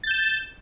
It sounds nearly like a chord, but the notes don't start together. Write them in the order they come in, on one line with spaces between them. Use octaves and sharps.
A6 G6 E7